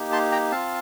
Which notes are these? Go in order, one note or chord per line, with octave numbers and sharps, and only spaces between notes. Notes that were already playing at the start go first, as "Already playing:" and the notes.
Already playing: A#3 D#4 G4
A5 C6
G5 A#5
C4 F4 F5 A5